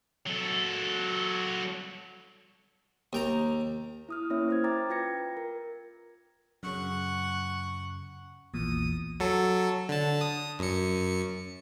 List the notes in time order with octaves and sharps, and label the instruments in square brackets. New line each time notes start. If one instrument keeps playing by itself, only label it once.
[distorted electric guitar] F#3 A4
[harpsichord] D#2 G5 A#5
[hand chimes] E4 D#6 F6
A#3 C#4 E4 C#5 E5
C5 F6 G#6
G5 A#5 D6 F6 A6
F4 B4 G5 G#6 A#6 C#7
A#4
[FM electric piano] F#2 C#3 [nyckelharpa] F#5 C#6
[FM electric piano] A#1 E2 A#2 [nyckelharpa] D#6
[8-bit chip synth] F#3 A4
D3 A5
D#6
F#2 C#7